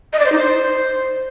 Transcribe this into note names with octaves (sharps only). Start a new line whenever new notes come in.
D#5
D5
C5
D#4
C5